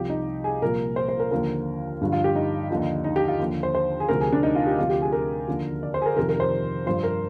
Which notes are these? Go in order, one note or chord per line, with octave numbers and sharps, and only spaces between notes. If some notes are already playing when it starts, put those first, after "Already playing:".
Already playing: C2 C3 F3 G4
D#4
G#4
C2 A#2 F3 A#4
C5
C5
A#4
D#2 D3 F3 A#4
G2 D3 F3
F4
G4
D#4
D#2 D3 F3
D#4
G4
F4
D#2 D3 F3
C5
C5
G#4
D2 C3 F3 A#4
G#4
D4
D#4
F4
G4
D2 C3 F3 F4
G4
G#4
A#4
D#2 D3 F3
D5
C5
G#4
A#4
F2 C3 D#3 A#4
A#4
C5
G2 F3 C5
A#4